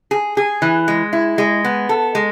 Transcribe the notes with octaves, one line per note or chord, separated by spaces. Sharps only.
G#4
G#4
E3
G#3
E4
G#3
B3
A4
G#3